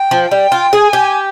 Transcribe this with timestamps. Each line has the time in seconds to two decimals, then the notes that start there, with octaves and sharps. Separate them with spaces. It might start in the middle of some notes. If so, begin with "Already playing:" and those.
Already playing: G5
0.11 F3
0.31 G3 G5
0.52 F4
0.72 G#4 G#5
0.93 G4